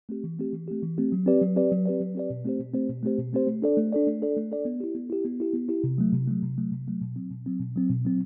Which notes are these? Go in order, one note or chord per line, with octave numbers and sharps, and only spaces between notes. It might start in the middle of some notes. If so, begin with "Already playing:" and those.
A3 C4 G4
E3
A3 C4 G4
E3
A3 C4 G4
E3
A3 C4 G4
F#3
C4 G4 B4 D5
F#3
C4 G4 B4 D5
F#3
C4 G4 B4 D5
F#3
C4 G4 B4 D5
B2
A3 C4 G4 C5
B2
A3 C4 G4 C5
B2
A3 C4 G4 C5
B2
A3 C4 G4 C5
A3
D4 A4 D5
A3
D4 A4 D5
A3
D4 A4 D5
A3
D4 A4 D5
B3
E4 G4
B3
E4 G4
B3
E4 G4
B3
E4 G4
C3
F#3 A3
C3
F#3 A3
C3
F#3 A3
C3
F#3 A3
B2
F#3 C4
B2
F#3 C4
B2
F#3 C4
B2
F#3 C4